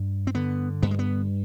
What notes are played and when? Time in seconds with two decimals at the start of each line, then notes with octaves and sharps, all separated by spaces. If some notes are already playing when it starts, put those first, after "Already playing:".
Already playing: G2
0.27 C4
0.35 D3 B3
0.82 G2 B3
0.91 G#3
0.99 B3